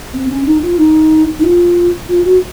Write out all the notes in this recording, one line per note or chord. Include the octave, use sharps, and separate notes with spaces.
C4
C#4
D#4
F4
D#4
D#4
F4
F4
F#4